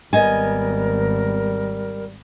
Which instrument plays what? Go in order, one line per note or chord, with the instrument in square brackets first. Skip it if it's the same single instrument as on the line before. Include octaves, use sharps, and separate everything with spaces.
[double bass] G#1 [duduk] G3 [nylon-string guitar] B3 D#5 G#5 [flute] A#4